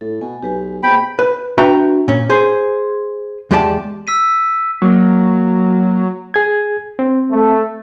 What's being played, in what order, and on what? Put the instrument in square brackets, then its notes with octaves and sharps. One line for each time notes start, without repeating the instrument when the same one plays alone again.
[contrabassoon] A2 [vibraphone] A4
[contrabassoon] B2 [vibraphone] G#5
[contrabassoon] B1 [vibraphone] G4 B4 G#5
[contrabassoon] B2 [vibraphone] A#3 G#4 C5 [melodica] G5 B5
[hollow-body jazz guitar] B4
D4 F#4 B4 E5 G5 A#5
A#2 C#4
G#4 C5
E2 G#3 G4 D5 D#5 A5
[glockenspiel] E6 B6 D#7
[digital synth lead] F#3 [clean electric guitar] A#3
[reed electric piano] G#4 G#6
C4
[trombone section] A3